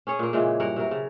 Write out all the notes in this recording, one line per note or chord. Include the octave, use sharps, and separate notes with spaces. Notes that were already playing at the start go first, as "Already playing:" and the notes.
C#4 G#4 C#5
A#2 A#3
A#2 C#3 E3 G#3
G2 A#4 F#5
C3 F#3 A#4
C#3